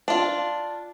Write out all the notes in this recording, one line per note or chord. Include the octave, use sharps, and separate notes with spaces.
D4 F4